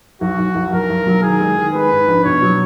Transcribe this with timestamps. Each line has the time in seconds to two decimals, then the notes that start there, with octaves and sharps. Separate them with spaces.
0.21 B1 F#4
0.39 B1
0.55 B1
0.73 B1 A#4
0.90 B1
1.07 F#3
1.22 D#3 G#4
1.40 G#3
1.57 D#3
1.74 G#3 B4
1.91 G#2
2.08 A#1
2.24 B2 C#5
2.42 F#3